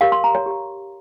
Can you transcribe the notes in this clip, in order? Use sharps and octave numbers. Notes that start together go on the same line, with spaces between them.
G4 A#4 C#5 F5
C6
A#5
C#5
G4 C#5